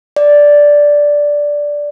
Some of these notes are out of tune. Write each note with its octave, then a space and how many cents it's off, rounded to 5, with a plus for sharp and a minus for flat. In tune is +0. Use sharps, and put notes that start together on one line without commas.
D5 -5